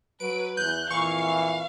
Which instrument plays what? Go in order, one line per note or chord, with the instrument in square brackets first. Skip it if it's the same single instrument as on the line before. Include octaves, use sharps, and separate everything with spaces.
[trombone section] F#3 [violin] B4 [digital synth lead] D7
[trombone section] E2 [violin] F#6 [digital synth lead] G6
[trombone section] F2 A#2 E3 [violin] F5 [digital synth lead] C#6